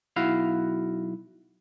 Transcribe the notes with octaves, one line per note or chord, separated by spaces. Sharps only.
B1 E4 F#4 F5